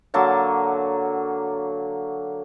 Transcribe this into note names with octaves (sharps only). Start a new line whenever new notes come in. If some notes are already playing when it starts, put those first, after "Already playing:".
D3 F#3 A#3 A5